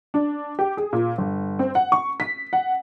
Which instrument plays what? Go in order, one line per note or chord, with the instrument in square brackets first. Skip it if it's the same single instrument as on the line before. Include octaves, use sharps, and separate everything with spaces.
[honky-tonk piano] D4
G4
G#4
A#2
G1
C4
F#5
C#6
B6
F#5